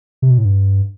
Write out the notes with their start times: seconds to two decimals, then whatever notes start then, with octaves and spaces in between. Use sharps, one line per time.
0.22 C3
0.31 B2
0.38 A2
0.45 G2